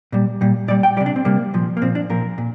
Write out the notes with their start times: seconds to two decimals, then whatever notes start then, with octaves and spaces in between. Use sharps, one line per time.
0.12 A#2 G3
0.41 A#2 G3
0.68 A#2 G3 D5
0.83 G5
0.97 G3 D5
1.00 C3
1.06 D4
1.16 C4
1.25 C3 G3 A#3
1.54 A#2 F3
1.77 A#3
1.82 A#2 F3 C4
1.95 D4
2.10 A#2 F3 A#4
2.38 A#2